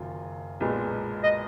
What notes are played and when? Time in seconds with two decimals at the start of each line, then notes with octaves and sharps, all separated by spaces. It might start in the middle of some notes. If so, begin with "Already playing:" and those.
Already playing: F#1 F#2 D#3 F4
0.60 B1 A#2 G#3 B3
1.23 D#5